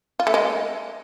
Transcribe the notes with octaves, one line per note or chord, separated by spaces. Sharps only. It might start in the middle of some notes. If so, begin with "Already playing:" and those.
F4
A3
G#3